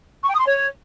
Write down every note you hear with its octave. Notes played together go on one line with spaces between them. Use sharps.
C#6
G5
D#6
C6
C#5